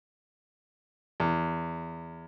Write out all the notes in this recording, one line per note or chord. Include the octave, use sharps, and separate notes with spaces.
E2